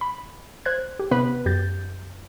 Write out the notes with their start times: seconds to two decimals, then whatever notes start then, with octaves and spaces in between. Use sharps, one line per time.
0.01 B5
0.66 C5 F#6 G#6
0.99 G4
1.11 C3 B3 B4
1.46 F#2 G4 G6 A6